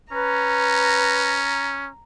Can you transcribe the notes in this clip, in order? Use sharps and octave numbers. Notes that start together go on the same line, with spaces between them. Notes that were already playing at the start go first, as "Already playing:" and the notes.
C#4 B4 A#5